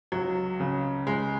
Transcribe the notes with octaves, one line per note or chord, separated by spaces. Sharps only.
C#2 F#3
C#3
C#2 G#3